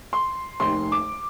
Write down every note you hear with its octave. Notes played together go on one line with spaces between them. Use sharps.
C6
F1 D#2 D#3 C6
D6